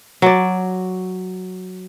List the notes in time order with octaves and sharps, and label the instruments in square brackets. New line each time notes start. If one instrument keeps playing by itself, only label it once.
[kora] F#3 D5